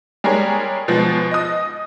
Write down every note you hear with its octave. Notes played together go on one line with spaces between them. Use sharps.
G3 G#3 G#4 A#4 C#5
B2 F3 G#3
D#5 D#6